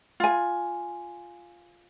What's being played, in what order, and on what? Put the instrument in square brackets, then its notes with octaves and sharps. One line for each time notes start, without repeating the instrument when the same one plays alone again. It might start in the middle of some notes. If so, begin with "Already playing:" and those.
[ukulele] F4 G#5